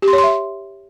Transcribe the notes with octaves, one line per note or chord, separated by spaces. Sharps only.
G4
C6
C#5
C6
E5